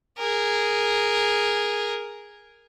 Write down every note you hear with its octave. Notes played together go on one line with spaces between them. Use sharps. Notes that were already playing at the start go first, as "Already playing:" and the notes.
G#4 A#4